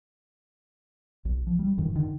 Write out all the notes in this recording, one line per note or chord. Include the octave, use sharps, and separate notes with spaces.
B1
F3
G3
F#2 D#3 E3
D3 D#3